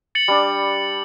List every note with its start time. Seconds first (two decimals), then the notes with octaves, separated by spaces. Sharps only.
0.15 A6 C#7 F#7
0.28 G3 D4